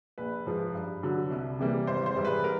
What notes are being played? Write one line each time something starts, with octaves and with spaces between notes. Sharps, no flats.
A#1 B4
G#2 F3
G2
D3 F#3
C2
C3 E3 G3 A#3
G#1 C5
C5
G#2 E3 G3
B4
A#4